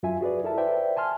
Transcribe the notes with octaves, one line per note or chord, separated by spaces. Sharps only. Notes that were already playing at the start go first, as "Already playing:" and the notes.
F#2 F4 E5 G#5
F#4 G#4 B4 D5
E4 A4 A#4 E5 A5
B4 C5 D5 E5 G5
G#5 A5 C6 F6